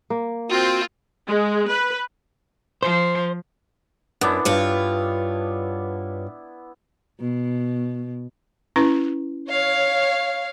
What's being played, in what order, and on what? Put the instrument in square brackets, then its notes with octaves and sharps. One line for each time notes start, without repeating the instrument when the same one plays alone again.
[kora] A#3
[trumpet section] C4 [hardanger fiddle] F4 [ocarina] F#4
[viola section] G#3
B4
[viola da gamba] F3 [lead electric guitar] C5
[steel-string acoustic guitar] F#2 [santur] B3 D4 E4
[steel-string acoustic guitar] G2 F4 C#5
[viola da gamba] B2
[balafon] C#4 E4 B4
[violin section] C#5 F5